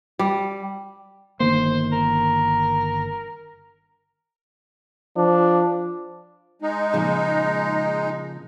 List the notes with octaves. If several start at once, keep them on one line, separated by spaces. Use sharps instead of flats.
G3
G1 D#3 A#3 C5
A#4
F3 D4
G#3 D#4
A#2 C#3 F3